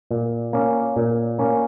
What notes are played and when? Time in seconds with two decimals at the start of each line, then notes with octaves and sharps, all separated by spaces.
0.11 A#2
0.53 A#3 C#4
0.96 A#2
1.38 A#3 C#4